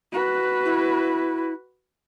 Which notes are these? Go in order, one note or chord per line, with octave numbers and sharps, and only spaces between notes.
F#4 B4
E4